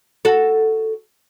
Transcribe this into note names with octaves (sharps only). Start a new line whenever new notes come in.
F#4 A4